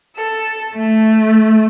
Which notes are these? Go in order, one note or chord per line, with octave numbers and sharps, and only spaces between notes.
A4
A3